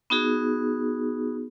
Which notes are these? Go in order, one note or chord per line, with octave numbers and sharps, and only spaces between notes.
B3 D#4 F#4 G#4